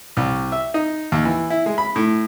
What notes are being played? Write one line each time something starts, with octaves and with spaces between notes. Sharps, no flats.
C2
E5
D#4
D#2
E3
E4
G#3
B5
A2